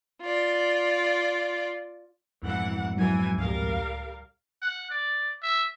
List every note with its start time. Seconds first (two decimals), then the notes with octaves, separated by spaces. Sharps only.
0.22 F4 D5
2.43 F2 G#2 E3 F#5
2.97 E3 F#3 D#4 G#5
3.38 C#2 A2 G3 A#4 F5
4.62 F#5
4.90 D5
5.42 E5